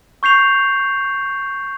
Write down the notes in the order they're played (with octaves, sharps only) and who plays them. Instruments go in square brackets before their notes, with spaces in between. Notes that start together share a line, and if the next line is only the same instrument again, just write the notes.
[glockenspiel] C#6 G6 C7 F7